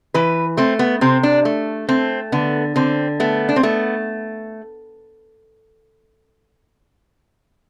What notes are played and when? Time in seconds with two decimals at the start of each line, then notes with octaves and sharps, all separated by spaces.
0.14 E3 B4
0.57 A3 C4
0.79 B3
1.01 C3 C4
1.23 D4
1.45 A3
1.89 A3 C4
2.32 D3 B3
2.76 D3 C4
3.20 A3 B3
3.49 D4
3.56 C4
3.63 A3 B3